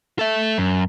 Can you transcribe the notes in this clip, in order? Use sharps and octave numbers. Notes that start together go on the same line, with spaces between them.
A4 E5
F#2